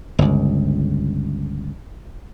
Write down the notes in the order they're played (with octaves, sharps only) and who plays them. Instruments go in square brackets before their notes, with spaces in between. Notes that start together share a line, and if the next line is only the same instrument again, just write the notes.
[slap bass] G1 C#2